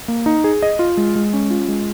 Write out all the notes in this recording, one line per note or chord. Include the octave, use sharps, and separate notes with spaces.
A#3
D#4
G#4
D#5
F4
G#3
G#3
C#4
F4
G#3